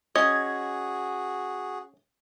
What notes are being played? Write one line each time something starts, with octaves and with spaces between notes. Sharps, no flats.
C#4 F#4 G#4 D#5 G#6